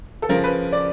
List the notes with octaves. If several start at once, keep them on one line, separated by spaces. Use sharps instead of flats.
A4
C#3 F3 A#4
B4
D5